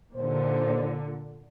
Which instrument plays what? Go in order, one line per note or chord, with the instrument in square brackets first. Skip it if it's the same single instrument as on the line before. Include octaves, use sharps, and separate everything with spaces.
[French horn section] D#2 C5 [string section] A#2 D3